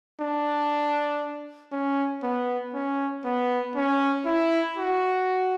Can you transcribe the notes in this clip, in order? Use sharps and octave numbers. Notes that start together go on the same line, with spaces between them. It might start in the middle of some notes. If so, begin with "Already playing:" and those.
D4
C#4
B3
C#4
B3
C#4
E4
F#4